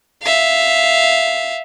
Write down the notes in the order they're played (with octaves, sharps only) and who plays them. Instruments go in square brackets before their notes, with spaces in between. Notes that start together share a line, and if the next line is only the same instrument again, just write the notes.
[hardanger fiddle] E5 F5